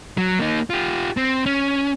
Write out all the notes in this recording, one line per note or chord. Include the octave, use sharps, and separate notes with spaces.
F#3
A#3 D#4
F4 G4
C4
C#4